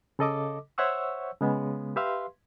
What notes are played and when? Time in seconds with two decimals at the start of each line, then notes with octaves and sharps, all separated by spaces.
0.19 C#3 A4 D#5 D6
0.78 C5 C#5 E5 F#5 C#6 E6
1.41 C#3 G#3 B3
1.96 G4 B4 E5 F5 C6